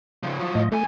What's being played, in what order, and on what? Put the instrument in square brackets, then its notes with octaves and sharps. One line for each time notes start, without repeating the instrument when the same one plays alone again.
[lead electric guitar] C#3 F3
F3 F#3
[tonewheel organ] A2 D#5
[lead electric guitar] F2 G#5 [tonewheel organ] A3